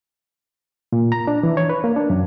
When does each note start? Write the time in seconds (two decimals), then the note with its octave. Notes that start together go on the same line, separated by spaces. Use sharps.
0.92 A#2
1.12 A#5
1.27 D4
1.43 E3
1.57 C#5
1.69 B4
1.84 A#3
1.96 D4
2.10 F#2